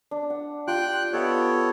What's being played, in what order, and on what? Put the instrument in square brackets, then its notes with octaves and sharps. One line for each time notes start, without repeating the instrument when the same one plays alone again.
[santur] D4
F#5
[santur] F4 G4 C6 [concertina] G5 F#6
[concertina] B3 A4 C#5 [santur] G4 D#5 F5